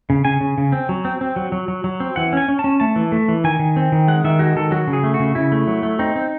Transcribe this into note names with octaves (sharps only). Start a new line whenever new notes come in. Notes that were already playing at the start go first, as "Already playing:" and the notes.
C#3
C#3 G#5
C#3
C#3
C4
F#3
C4
C4
F#3
F#3
F#3
F#3
C4
E3 F#5
C#4 G#5
C#4
A5
C#4
A3 A5
E3
A3
E3
D#3 G#5
D#3
C4
D#3
G#3 F#5
D#3 E5
G#3 F#4
D#3 A4
F#3 F#4
C#3
G#4
A3
F#4
C#3
C#3 E4
A3
F#3
A3
C4 D#4
C4